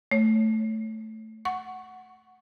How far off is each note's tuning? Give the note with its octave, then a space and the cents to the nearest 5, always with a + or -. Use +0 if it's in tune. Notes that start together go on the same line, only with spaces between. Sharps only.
A3 +0 C#5 +0
F#5 +0 C#6 +0